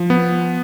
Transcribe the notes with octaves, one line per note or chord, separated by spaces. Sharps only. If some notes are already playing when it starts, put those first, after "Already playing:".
Already playing: F3
B3